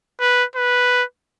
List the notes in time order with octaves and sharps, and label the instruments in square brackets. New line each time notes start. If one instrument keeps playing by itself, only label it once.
[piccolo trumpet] B4
B4